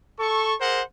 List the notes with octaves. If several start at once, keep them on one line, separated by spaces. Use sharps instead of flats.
A4 C#6
G#4 A#4 C5 F#5